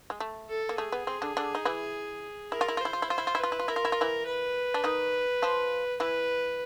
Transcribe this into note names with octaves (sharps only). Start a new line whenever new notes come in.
G#3
A3
A4
A#3
A3 G#4
B3
C4
D3 D4
D3 D4
D#4
E3 E4
E4 A#4
F4
E4
F4
E4 C5
F4
E4
F4 C5
E4
F4
E4
F4 B4
E4
F4
E4 A#4
F4
E4
F4
E3 E4
B4
D4
D#3 D#4
F3 F4
E3 E4 B4